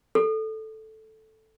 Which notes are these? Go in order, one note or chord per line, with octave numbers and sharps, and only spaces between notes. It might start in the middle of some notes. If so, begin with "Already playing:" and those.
A4